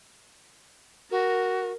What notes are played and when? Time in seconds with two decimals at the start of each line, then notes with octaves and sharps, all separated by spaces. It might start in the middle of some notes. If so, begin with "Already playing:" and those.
1.11 F#4 A#4